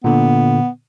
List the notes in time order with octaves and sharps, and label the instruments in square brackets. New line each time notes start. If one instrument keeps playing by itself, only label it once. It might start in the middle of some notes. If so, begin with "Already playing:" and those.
[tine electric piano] A#2 D3 [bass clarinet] B3